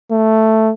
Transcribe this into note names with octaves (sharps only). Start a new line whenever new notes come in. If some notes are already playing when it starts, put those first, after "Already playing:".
A3